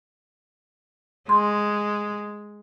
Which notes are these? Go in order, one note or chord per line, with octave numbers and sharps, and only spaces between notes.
G#3 C6